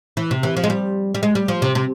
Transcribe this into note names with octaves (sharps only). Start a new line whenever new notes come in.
E3
C3
E3
F3
G#3
G3
G3
G#3
G3
F3
C3
C3